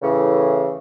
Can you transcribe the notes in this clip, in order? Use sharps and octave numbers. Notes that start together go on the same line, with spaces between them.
A2 C#3 E3